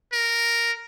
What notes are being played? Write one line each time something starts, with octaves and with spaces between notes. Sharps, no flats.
A#4